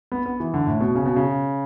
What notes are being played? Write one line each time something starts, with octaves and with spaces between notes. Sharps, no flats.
B3
B3
E3
D3
A2
B2
C#3
B2
C#3